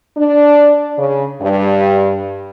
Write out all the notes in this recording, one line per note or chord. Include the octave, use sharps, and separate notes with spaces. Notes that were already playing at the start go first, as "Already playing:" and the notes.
D4
C#3
G2